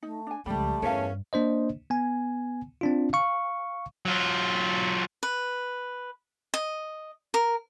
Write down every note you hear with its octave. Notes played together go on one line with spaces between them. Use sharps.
A3 D#4
D4 G#5
C#2 F3 G3 A3 B5
E2 G2 C#4 A#4 E5 F5
A#3 D4 C5 D#5
B3 G#5
C4 D4 F4
F5 C#6
F#3 F4
B4
D#5
A#4